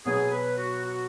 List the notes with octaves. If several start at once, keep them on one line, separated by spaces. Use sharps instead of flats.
B2 F#3 B3 G#4
B4
F#4
F#4